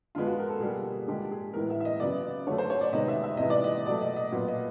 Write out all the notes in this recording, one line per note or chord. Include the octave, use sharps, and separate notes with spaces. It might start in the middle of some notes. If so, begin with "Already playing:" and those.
D3 F3 G#3 B3 F4
F#4
A#4
A4
B2 G3 A#3 G#4
D3 F3 G#3 G4
G#4
A2 E3 G#3 B3 A#4
E5
E5
D#5
C#3 F#3 B3 D5
D3 F#3 A3 C#5
C5
C#5
D5
C3 D#3 G#3 B3 D#5
E5
E5
C3 E3 G#3 B3 D#5
D5
D#5
B2 F#3 A3 D5
D#5
D#5
A#2 F#3 B3
D#5